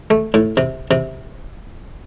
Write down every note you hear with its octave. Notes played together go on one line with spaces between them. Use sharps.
A3
A2
C3
C3